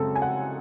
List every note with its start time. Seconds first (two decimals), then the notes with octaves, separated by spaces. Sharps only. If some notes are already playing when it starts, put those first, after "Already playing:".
Already playing: F#2 C#3 G#3 C4 A4
0.15 G#5
0.22 F#5